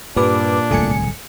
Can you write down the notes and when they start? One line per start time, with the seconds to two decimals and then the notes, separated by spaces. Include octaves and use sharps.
0.16 G2 A#2 D4 G4 B4 D6
0.71 D1 C2 B2 A3 G#5 C#7